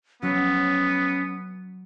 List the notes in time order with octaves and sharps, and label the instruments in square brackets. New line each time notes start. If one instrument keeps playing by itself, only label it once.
[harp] F#3 [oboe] B3 [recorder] C#4